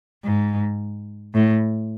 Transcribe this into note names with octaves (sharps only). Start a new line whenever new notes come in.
G#2
A2